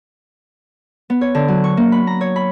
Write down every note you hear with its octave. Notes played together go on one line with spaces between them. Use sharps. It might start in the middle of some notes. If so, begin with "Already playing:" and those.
B3
C#5
D3
F#3
C#6
A#3
B5
A#5
C#5
B5